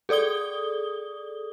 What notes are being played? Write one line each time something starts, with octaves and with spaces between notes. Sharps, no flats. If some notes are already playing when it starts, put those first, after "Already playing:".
G#4 A4 D5 D#6 G7